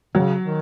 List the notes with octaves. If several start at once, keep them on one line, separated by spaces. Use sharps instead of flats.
C#3 F#3
D#3